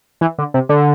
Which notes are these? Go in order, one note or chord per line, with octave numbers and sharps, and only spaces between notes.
E3
D3
C3
D3